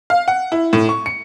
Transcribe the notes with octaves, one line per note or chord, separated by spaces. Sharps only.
F5
F#5
E4
A2
C#6
C#7